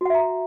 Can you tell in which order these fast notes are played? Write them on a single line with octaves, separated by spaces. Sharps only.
F#4 F#5 E5 A#5